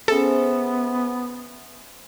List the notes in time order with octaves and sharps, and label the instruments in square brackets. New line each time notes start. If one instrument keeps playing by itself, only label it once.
[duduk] B3 [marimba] C#4 G#4 [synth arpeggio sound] A4 [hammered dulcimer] C5 E5 G#5